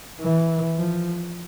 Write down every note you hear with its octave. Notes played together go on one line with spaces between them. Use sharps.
E3
F3